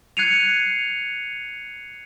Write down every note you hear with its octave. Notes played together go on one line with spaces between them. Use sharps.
F#6 G#6 C7 C#7 D#7 F7